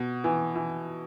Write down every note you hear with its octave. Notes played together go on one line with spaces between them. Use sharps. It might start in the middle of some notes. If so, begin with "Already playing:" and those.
Already playing: B2
E3
E3